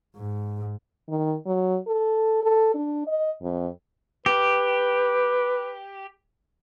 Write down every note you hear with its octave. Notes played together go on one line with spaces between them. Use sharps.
G#2
D#3
F#3
A4
A4
D4
D#5
F2
G4 B4